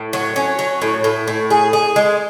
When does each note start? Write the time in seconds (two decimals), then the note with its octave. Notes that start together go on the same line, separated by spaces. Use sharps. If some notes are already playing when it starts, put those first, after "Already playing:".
Already playing: A2
0.13 F#3
0.36 C#4
0.59 F#3
0.82 A2
1.04 A2
1.28 A2
1.50 G#4
1.73 G#4
1.96 G#3